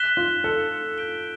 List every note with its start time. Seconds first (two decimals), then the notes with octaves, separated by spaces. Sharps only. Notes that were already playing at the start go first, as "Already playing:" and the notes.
Already playing: F#6 B6 E7 G7
0.17 F4
0.44 A4
0.98 G6 B6 D7 G7